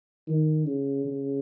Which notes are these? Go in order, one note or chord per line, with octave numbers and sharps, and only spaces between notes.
D#3
C#3
C#3